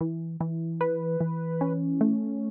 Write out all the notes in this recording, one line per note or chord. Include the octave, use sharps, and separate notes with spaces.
E3
E3
B4
E3
C#4
A3